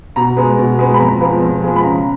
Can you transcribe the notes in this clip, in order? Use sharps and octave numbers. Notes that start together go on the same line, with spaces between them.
B2 A#5
G#3 B3
B2
G#3 B3
B5
F2 A#5
F3 G#3 B3
F2
F3 G#3 B3
B5
C#3 A#5